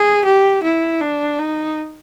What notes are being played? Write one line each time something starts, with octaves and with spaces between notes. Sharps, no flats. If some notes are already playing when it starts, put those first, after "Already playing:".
Already playing: G#4
G4
E4
D4
D#4